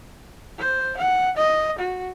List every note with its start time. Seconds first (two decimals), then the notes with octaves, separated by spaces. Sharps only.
0.58 C5
0.98 F#5
1.37 D#5
1.79 F#4